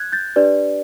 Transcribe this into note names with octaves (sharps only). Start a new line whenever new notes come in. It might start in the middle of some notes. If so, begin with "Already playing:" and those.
Already playing: F#6 G#6
G6 A6
D4 G4 B4 D5